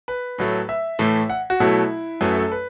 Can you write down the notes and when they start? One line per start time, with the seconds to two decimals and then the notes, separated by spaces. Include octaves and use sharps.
0.08 B4
0.38 A2 F#3 A3
0.69 E5
0.99 A2 E3 A3
1.30 F#5
1.50 F#4
1.60 B2 F#3 A3 E4
2.21 F#2 F#3 A3 B4
2.36 A4
2.52 B4